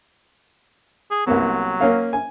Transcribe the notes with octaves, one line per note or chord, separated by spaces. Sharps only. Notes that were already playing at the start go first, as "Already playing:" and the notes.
G#4
C2 F#3 A#3 B3
A#3 C#4 F5
G#5